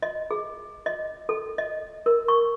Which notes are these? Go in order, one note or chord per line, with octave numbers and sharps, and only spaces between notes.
D#5
G#4
D#5
A4
D#5
A#4
C#6